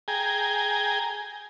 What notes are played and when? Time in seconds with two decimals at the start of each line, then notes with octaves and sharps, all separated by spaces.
0.08 G#4 G5 G#5 A#5